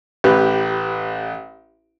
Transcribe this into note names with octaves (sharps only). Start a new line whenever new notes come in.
A1 G4 B4